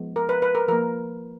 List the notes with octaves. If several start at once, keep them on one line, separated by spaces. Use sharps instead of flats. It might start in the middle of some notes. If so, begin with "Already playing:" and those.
Already playing: F3 G#3 B3
A#4
B4
B4
A#4
F3 A#3 A#4